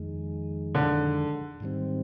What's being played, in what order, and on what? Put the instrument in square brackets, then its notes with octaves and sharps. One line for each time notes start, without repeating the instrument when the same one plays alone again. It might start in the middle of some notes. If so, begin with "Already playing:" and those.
Already playing: [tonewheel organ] F2 D#3 G#3
[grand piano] D3
[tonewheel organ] G#2 D#3 G3 C4